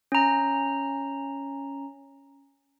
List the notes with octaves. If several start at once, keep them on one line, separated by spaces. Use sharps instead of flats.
C#4 A#5